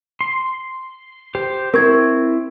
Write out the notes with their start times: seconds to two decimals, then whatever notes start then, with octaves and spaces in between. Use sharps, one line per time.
0.21 C6
1.35 G4 C5
1.74 C4 E4 A#4 C#6 G#6